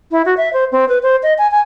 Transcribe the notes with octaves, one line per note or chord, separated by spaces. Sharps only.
E4
F#4
E5
C5
C4
B4
C5
D#5
G#5
G#5